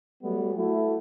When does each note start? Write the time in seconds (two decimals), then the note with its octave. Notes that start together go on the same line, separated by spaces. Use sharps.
0.23 F#3 G3 A3 B3
0.56 A3 E4 F#4